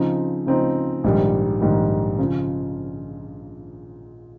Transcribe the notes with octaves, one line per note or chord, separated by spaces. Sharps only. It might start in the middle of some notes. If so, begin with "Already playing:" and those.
Already playing: C#3 F3 C4 D#4
C#3 F3 C4 D#4
A#1 G#2 D#3 G3
A#1 G#2 D#3 G3
C#3 F3